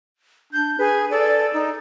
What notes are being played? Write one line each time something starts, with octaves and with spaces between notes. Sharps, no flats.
D4 G6
G#4 B4
A4 D5
D#4